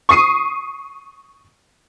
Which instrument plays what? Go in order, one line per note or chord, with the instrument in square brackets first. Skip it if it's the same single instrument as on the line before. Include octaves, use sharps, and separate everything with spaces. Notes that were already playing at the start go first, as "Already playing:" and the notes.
[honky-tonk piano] C#6 D#6 C7 D#7